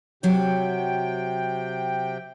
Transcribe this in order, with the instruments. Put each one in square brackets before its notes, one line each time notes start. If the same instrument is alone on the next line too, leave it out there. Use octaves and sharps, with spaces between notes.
[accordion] C3 G5 [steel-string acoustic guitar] F#3 F#4 C#5